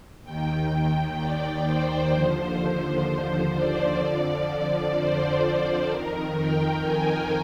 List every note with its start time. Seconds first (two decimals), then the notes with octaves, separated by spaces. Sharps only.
0.23 D#2 D#3 G5
1.18 D5
1.66 C5
2.12 D#2 D3 F3
3.06 C5
3.54 D5
4.01 F2 D3 F3 D5
4.47 D5
4.95 C5
5.43 C5
5.90 F2 D#3 A#4
6.37 G5
6.83 G#5